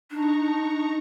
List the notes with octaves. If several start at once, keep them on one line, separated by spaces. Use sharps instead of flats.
D4 D#4 A#5 C#6